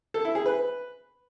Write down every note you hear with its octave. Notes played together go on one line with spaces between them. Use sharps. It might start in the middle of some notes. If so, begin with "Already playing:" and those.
A4
E4
G#4
B4